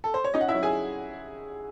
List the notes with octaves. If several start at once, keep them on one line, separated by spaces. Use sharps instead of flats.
A4
C5
C#5
C#4 D#4 D#5
F#5
E4 E5
F#3
G#4 G#5